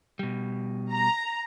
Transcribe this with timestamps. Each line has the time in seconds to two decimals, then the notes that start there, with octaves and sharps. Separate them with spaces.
0.19 B2 G3
0.91 A#5